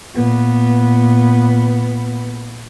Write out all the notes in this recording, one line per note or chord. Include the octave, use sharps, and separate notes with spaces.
A#2 B3